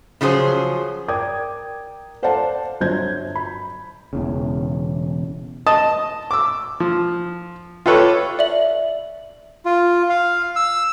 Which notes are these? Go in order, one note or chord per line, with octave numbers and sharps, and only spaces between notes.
C#3 F3 F#3 G#4 C5
A#4 D5 G5 D6 D#6 G#6
A4 C5 D5 F5 F#5 A5
G1 F#3 C5 G6 G#6
B5
E1 E2 C#3
D#5 A5 D#6
D6 E6
F3
F4 G4 A4 B4 C#5
D5 E5 F#7
F4
F5
E6